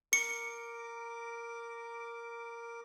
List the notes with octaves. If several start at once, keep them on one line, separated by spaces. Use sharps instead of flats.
A#4 D6 C#7